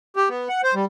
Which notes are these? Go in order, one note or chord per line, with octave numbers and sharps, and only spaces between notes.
G4
B3
F#5
C5
G3